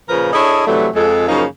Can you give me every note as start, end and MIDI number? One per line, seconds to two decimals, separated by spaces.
0.09 0.30 46
0.09 0.30 49
0.09 0.30 53
0.09 0.30 70
0.09 0.30 71
0.33 0.66 62
0.33 0.66 64
0.33 0.66 68
0.33 0.66 69
0.33 0.66 73
0.33 0.66 75
0.67 0.87 48
0.67 0.87 52
0.67 0.87 54
0.67 0.87 55
0.67 0.87 57
0.95 1.27 41
0.95 1.27 56
0.95 1.27 69
1.28 1.44 42
1.28 1.44 49
1.28 1.44 53
1.28 1.44 58
1.28 1.44 61
1.28 1.44 63